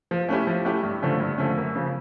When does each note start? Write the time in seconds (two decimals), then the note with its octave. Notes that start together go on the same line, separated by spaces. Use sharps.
0.11 F3
0.29 A3 C#4 E4 G4
0.47 F3
0.65 A3 C#4 E4 G4
0.83 G2
1.02 D3 F3 A3 C#4
1.20 G2
1.38 D3 F3 A3 C#4
1.57 F#2
1.75 C#3 F3